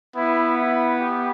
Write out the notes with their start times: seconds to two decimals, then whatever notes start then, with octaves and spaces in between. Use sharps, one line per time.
0.16 B3 E4
0.58 E4
0.99 G4